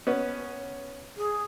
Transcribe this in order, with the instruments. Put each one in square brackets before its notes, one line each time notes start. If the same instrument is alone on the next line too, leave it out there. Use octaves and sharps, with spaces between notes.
[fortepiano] B3 C#4
[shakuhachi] G#4